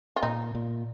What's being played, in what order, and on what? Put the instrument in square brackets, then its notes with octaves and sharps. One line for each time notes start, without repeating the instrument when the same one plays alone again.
[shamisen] F4
[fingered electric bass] A#2 [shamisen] D#4
[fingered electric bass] A#2